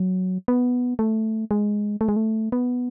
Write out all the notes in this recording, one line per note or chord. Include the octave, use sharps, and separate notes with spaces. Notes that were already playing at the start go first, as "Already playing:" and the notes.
Already playing: F#3
B3
A3
G#3
A3
G#3
A3
B3